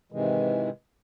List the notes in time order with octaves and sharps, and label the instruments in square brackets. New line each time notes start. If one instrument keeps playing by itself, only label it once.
[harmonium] G#2 C3 D#3 E3 G#3